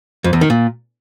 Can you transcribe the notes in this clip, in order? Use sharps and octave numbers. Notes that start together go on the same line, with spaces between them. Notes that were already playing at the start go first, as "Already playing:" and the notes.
F2
E2
D#3
A#2